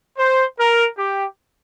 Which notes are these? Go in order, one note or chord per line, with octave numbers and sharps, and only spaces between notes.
C5
A#4
G4